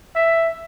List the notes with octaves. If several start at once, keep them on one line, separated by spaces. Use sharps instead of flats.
E5